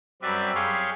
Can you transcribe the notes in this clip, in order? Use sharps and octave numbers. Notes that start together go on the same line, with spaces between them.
F#2 G3 C4 B4 D5 E5
G4 G#4 C#5 F5 C6